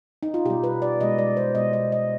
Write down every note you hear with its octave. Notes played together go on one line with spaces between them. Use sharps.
D#4
F4
B2 G3 G4
B4
D5
B2 G#3 D#5
D5
C5
B2 G#3 D#5
D#5
D#5